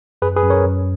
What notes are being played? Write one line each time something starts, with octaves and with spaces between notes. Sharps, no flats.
F#2 G#4 B4
G#4 B4
F#2
A#4 C#5
F#2